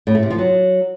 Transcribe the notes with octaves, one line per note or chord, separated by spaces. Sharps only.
A2
A3
C3
F3
F#3